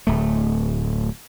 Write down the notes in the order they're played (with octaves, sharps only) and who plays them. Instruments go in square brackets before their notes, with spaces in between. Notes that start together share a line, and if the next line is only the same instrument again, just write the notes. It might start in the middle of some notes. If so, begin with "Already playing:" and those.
[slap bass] D1 A3